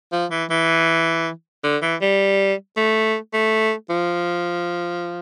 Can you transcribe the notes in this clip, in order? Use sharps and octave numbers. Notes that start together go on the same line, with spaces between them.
F3
E3
E3
D3
E3
G3
A3
A3
F3